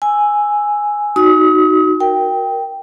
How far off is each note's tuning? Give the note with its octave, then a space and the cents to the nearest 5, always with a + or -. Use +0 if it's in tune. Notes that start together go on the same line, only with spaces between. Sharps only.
G#5 +0 E6 +0
D#4 +0 F#4 +0 D#6 +40
A#4 +0 G5 +0